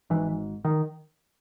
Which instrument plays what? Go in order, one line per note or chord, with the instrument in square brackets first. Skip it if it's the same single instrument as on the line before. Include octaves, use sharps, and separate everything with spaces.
[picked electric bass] G#1 G#2 E3
D#3